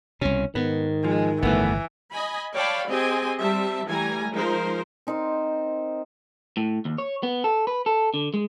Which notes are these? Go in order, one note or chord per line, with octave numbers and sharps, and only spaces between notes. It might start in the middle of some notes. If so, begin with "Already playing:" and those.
C2 B2 C#4
G#2 D#3 B3
F3 G#3
G1 F2 A2 E3 A3 B3
D#5 G#5 B5
C#5 D5 F5 G5 A5 B5
C4 G4 G#4 D#5 G#5
G3 C4 E5 A5
E3 G3 A3 G#5 A#5
F3 G#3 D#4 A#4 C5
C4 D#4 A#4 C5
A2
D#2
C#5
B3
A4
B4
A4
D3
G#3